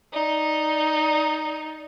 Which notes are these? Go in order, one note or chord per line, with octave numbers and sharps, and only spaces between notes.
D#4 D5